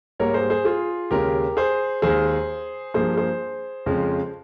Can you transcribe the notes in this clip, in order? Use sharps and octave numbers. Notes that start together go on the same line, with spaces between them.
G#2 G3 A#3 A#4 C#5
G#4 C5
G#4 C5
F4 G#4
D#2 C#3 G#3 G4 A#4
G#4 C5
D#2 D#3 G#3 G#4 C5
G2 F3 A#3 G#4 C5
G#4 C5
F2 C#3 F3 G#3